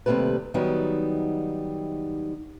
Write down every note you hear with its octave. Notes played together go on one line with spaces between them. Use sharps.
D#2 C3 D#3 G3 A3 B4
D#3 F#3 G3 B3 D#4